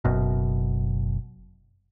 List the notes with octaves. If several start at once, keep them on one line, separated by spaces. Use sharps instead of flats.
F#1 F#2 B2